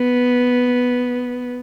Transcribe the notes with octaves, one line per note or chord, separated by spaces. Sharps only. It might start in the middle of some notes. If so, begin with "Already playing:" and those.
Already playing: B3